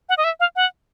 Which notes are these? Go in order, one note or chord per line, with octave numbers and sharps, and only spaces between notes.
F#5
D#5
E5
F5
F#5